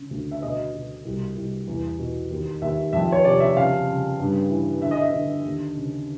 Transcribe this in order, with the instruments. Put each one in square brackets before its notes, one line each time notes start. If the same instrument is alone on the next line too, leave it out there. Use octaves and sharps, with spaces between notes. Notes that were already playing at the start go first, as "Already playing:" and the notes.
Already playing: [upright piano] C#3
D2
E5
B2 D#5
B2
C2
C2
E2
B2
D#2
D#2 E5
F2 E5
C#5
C3 D5
E5
C#3 F5
C#3
G2
E3
D3 E5
D#5
E5
D3
D#2
C#3